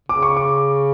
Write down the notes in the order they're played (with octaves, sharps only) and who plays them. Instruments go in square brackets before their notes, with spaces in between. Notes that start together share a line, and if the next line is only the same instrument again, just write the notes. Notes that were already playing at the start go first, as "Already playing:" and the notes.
[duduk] C#3 [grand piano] D6
[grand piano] C#6
D6